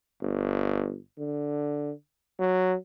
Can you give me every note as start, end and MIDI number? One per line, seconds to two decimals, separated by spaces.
0.22 0.97 31
1.19 1.92 50
2.39 2.75 54